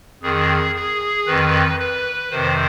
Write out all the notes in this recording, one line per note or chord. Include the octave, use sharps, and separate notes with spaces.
F2 D#3 G#4
G#4
F2 D#3 B4
B4
F2 C3 D#3 C5